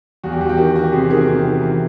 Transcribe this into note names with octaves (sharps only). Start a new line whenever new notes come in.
E2 F#4
G4
E2 F#4
G4
D#3 F#4
D#3 F#4
G4
C3 F#4 G#4
D#3 F#4 G#4
C3
D#3
E3